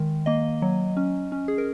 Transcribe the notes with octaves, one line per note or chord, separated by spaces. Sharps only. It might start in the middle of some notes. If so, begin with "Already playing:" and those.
Already playing: D#3 G#3
A#3 D#5
F#3
C#4
C#4
G#4
A#4